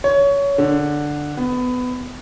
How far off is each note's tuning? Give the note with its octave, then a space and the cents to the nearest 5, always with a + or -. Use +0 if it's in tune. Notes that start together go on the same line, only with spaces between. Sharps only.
C#5 +20
D3 +5
B3 +20